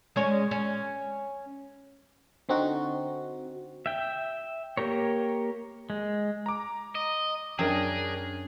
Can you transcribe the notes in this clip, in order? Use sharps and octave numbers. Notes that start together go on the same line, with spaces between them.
G#3 C#4 C#5
C#4
D3 C4 D#4 F#4
E5 G5
A#3 G4 A#4 C#5
G#3
A#5 D6
D#5
F#2 D4 G#4 A#4 G5